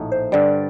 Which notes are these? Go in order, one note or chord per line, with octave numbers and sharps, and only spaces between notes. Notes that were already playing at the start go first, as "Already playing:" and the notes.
Already playing: A#1 A2 A3 D#4
C5
G2 D3 G3 D5